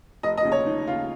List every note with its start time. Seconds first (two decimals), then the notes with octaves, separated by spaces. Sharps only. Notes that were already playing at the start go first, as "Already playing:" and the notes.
0.23 F1 D#5
0.37 D#5
0.45 D#2 C#3
0.52 C#5
0.66 F1 D#4
0.87 D#2 C#3 F4